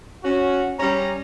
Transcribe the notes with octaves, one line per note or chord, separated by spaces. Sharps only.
C#4 F#4
G3 C#4 A#5